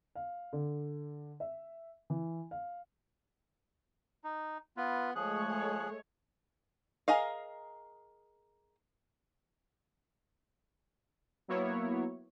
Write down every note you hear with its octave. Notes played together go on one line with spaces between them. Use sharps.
F5
D3
E5
E3
F5
D#4
B3 F4 B4
F3 G#3 A3 G#4 C#5 F#6
G#4
G#4 A#4 D#5 F5
F#3 A#3 B3 E4 C#5